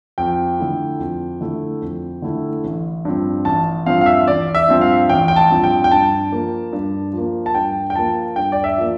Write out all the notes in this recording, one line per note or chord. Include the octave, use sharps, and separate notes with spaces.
F2 G5
D3 A3 E4
F2
D3 A3 E4
F2
D3 A3 E4
A1
G2 F3 C4
A1 A5
G2 F3 C4 F5
F5
E5
A1 D5
E5
G2 F3 C4
F5
A1 G5
G5
A5
G2 F3 C4
G5
G5
G2 A5
F3 A#3
G2
F3 A#3
A5
G2 G5
G5
F3 A#3 A5
G2 G5
D5
E5
F3 A#3